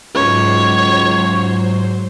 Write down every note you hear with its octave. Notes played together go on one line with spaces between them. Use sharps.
C#2 G#2 F#3 C5 C#5